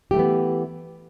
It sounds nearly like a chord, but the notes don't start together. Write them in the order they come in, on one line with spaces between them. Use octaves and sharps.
G4 A3 E3 B3